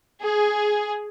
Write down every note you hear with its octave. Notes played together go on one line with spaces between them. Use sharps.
G#4